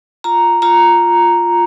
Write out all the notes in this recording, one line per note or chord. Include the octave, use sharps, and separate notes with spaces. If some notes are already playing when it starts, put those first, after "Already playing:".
F4 A#5
F4 A#5